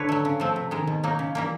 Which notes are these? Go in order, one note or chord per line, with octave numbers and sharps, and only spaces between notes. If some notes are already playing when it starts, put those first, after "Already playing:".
Already playing: D3 B4 C#5
F#3 A3
C#3
F3 A3 C4
C3
D#3 G#3
B2
F#3 A#3 D#4
C#3
E3 G3 A#3